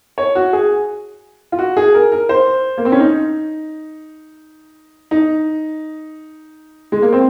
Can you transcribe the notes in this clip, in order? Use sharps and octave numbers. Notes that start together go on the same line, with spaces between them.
C#5
F#4
G#4
F4
F#4
G#4
A#4
A#4
C5
A#3
C4
C#4
D#4
D#4
G#3
A#3
C4